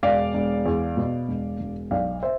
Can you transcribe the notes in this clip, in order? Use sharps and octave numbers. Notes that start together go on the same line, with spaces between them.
E1 D5 F5
E1
E2
B2
E1
E1
B1 D5 F5
C5 E5